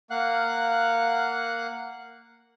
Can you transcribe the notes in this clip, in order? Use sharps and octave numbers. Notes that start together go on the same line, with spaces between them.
A#3 F5 F#5 F#6